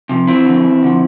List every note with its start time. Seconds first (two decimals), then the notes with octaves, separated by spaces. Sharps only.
0.09 C3 F3
0.27 E2 C4 E4
0.45 D3 F3
0.64 E2
0.83 D3 F3